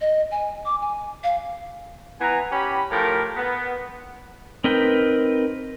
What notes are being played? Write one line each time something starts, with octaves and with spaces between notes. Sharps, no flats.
D#5
G#5
D6
G#5
F5
E3 B3 G#5 A#5
C#4 G4 B5
A2 F3 G4 A#4
B3
C4 D#4 A#4 B4 G5